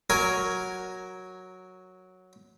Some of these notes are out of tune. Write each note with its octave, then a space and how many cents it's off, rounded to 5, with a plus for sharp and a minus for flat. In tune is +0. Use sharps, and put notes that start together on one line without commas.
F#3 +0 A#4 +0 G#5 +0